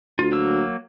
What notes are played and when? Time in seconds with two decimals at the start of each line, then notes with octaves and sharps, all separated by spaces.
0.19 D2 F4
0.32 F#3 A#3 E6